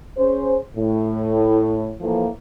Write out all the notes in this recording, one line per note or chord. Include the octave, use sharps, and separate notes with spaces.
C#4 G#4 C5
A2
A2 E3 F3 A3 A#3